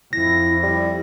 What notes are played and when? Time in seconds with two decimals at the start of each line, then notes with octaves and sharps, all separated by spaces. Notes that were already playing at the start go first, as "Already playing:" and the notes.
0.13 F2 E4 A#6
0.63 G3 E4